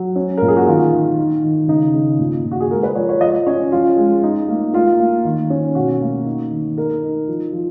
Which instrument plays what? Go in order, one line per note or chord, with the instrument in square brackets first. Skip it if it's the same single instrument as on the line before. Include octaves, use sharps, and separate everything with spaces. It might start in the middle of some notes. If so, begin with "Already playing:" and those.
Already playing: [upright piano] F#3
C#4
A#2 A#4
G#4
F#4
D#3 F4
D#3
D#4
D#3
C#3 D#4
C#3
A#2
A#2
F#4
G#4
G#3 A#4
B4
F3 C#5
C#5
F3 D#5
C#4 C#5
F3 F4
G#3
D#4
A#3
A#3 F4
A#3
D#3
C#4
B2 F#4
A#3
D#4
D#3
D#4 A#4
D#4
F3
F3